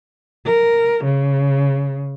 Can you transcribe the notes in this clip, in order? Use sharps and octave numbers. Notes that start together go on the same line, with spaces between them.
A#4
C#3